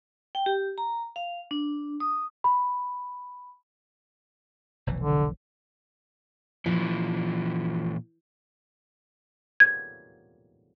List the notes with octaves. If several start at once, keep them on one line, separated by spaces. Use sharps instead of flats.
G5
G4
A#5
F5
D4
D#6
B5
F1 B1 E3
D3
A#2 E3 F3
G#6